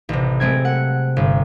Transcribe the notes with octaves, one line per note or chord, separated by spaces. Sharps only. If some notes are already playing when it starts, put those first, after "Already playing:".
A1 C3
G#3 A3 C4 G#6
F#5
G1